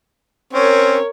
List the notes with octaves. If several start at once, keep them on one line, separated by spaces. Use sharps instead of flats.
C4 C#4 A#4 C#5